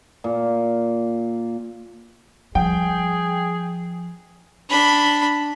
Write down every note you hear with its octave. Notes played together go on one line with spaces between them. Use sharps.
A#2
F3 G3 G#4 G5
D4 B5